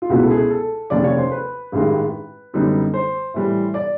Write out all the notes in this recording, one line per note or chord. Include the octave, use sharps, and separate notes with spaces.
F4
C#2 B2 G#3 B3 E4 F#4
A4
G#4
A4
F1 D#2 C#3 D5
C#5
C5
B4
A1 G2 D#3 G#3
F#2 D3 G3 B3 D#4
C5
A2 E3 G3
D5